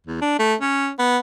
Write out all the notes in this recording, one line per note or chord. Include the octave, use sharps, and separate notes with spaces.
E2
D4
A3
C#4
B3